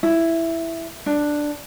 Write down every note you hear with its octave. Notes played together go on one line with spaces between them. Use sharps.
E4
D4